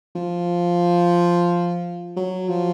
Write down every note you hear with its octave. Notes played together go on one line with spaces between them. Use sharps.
F3
F#3
F3